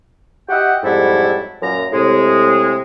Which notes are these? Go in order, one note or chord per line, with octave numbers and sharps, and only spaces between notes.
F#4 G4 D#5 E5 F#5 G5
F2 G#2 F#3 G3 E4 A4
F#2 A#2 A#5
A2 C3 G#3